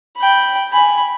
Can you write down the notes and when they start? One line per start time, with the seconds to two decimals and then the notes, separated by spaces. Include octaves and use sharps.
0.17 G5 B5
0.71 G#5 B5